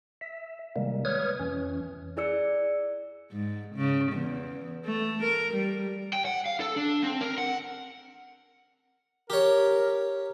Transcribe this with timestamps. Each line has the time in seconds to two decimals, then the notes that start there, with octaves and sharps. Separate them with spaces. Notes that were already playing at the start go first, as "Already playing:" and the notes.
0.21 E5
0.76 C3 D#3 G3 G#3 A#3
1.05 B4 C#5 D#6 F6 G#6
1.40 F2 E3 C#4
2.17 E4 G#4 D5 E6 C#7
3.31 G#2
3.76 C#3
4.12 E2
4.85 A3
5.24 A#4
5.54 G3
6.13 G5
6.25 F#5
6.46 F5
6.60 A4
6.76 D4
7.03 C4
7.21 A#4
7.38 F#5
9.30 G4 A#4 C#5